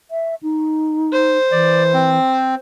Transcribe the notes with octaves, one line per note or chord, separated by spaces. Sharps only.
E5
D#4
C5
E3 D5
C4